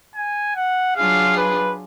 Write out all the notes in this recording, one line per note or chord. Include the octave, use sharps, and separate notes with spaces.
G#5
F#5
F#3 D4 F4 G#4 F5
B4